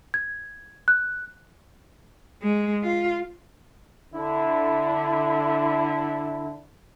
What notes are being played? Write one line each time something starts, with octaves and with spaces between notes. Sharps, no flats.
G#6
F#6
G#3
F4
D3 E4